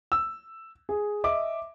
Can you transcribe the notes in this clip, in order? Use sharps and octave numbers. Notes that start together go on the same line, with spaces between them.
E6
G#4
D#5 E5 D6